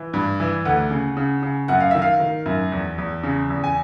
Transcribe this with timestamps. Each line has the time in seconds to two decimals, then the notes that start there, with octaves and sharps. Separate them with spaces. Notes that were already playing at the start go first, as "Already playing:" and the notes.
Already playing: E3
0.13 G2
0.40 E3
0.65 D2 F#5
0.91 C#3
1.17 C#3
1.43 C#3
1.68 F#2 F#5
1.80 F5
1.91 D#3 E5
2.02 F5
2.20 D#3
2.46 F#2
2.72 E2
2.98 E2
3.24 C#3
3.50 E2
3.64 G#5